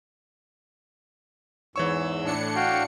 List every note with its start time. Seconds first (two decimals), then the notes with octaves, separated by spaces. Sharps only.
1.76 E2 G#2 E3 C#5 C#6 E6
2.23 A2 D4 C#7
2.56 F#4 F5 G5